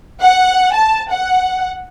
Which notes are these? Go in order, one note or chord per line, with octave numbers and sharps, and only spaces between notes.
F#5
A5
F#5